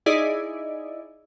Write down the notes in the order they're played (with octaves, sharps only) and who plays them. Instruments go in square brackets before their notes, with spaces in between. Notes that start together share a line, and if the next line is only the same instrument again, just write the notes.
[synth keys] D#4 E4 G#4 D5 D#5